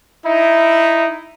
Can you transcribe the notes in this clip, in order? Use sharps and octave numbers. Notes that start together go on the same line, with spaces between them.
D#4 E4